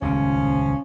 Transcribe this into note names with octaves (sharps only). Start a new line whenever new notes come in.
D#1 C#2 A#2 F3 C#4